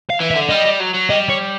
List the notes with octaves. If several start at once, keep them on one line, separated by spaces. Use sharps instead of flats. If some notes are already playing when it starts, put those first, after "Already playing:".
F5
E3
E5
D3
G3 D#5
G3
F#3
F#3
G3 D#5
C#5